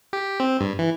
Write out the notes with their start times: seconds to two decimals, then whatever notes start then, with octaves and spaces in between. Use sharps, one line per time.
0.13 G4
0.40 C4
0.61 G2
0.79 E3